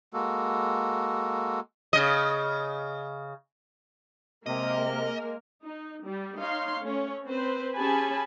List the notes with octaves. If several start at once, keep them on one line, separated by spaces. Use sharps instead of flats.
G#3 A#3 F#4 A4
C#3 D#5
C3 G#3 A#3 A#4 D#5
D#4
G3
D#4 C#5 F5 C6
A3 C#4 C#5
C4 B4 C5
C#4 G4 G#4 G#5 A5 B5